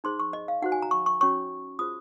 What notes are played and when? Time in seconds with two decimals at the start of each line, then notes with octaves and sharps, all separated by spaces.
0.04 D#4 G#4 C5 C6
0.20 C#6
0.33 D#5
0.48 F5
0.62 D#4 F#4 C5 F#5
0.72 G#5
0.82 A#5
0.91 C#6
1.06 C#6
1.21 C#4 F#4 C#5 C#6
1.79 F4 G#4 C5 D#6